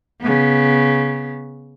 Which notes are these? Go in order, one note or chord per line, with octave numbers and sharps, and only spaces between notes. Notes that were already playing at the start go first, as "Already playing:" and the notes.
C#3 B3